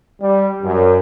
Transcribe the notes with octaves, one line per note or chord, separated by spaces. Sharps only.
G3
F#2